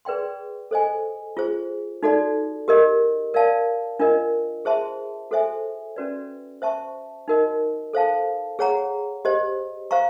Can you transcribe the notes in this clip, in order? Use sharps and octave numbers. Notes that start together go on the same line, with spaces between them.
G#4 B4 D5 G5 C6
A4 C5 D#5 G#5
F4 G#4 C5
D#4 F#4 A4 D5
G4 A#4 D#5
A#4 D5 F5 A5
D4 F4 A#4 D#5
G#4 C5 E5 A5 C6
F#4 A4 C5 E5 G#5
C#4 F#4 B4 D5
C5 E5 A5 C#6
D#4 F#4 A#4 D#5
A4 C5 F5 A5
G#4 C#5 F#5 A#5
G4 C5 D#5
C5 F5 A#5 C#6